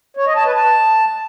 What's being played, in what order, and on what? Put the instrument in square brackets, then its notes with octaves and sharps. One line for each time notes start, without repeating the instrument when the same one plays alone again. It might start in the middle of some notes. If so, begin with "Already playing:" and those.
[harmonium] C#5
D#5
A5
B4
A5